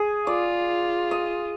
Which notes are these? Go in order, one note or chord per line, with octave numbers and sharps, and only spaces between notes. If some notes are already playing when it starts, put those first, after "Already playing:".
Already playing: G#4
F4 D5
D#5